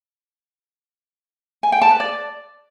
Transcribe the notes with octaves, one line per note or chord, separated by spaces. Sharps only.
G#5
G5
A5
B4
D5